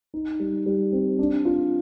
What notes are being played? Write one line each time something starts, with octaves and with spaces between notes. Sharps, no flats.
D#4
G3
G3
C4
D4
F4